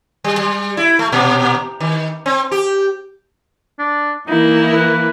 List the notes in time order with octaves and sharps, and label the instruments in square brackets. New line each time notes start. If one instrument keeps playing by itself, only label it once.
[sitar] G3
G3
E4
A3
A#2
D#3
C4
G4
[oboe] D4
[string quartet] E3 A#3 E4 [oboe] D#4
[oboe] B4